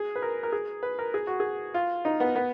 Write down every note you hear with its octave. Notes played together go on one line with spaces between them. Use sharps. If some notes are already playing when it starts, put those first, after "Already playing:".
Already playing: G#4
B4
A#4
A#4
G#4
B4
A#4
G#4
F#4
G#4
F4
D#4
B3
B3